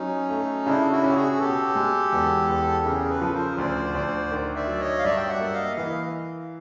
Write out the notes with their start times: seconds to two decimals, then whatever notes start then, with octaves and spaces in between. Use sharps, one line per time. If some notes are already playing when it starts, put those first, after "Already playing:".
Already playing: F#3 C#4 D#4
0.29 A3
0.66 C#3 D4 E4
0.91 E4 F#4
1.03 C#4 G4
1.15 F#4 G#4
1.32 G#4
1.39 B2 G4 A4
1.75 G#3
2.12 E2
2.49 E2
2.85 C#3 G#4 A#4
3.09 A4 B4
3.21 F3
3.34 A#4 C5
3.58 D2 C5 D5
3.94 D2
4.31 D#3
4.55 D5 E5
4.67 F#3
4.79 C#5 D#5
4.98 F5
5.03 G2 D5 E5
5.17 G5
5.29 E5 F#5
5.40 A#3
5.53 D#5 F5
5.77 E3 D#5 F5